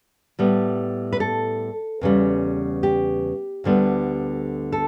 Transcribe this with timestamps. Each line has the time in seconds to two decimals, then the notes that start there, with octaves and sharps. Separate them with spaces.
0.39 A2 G3 B3
1.13 B4
1.20 A4
2.01 E2 C#3 G3
2.83 G4
3.64 D2 D3 G3 B3
4.72 A4